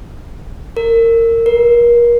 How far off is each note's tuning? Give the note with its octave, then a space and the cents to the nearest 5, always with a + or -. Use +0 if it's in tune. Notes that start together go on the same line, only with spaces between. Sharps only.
A#4 -25
A#4 +35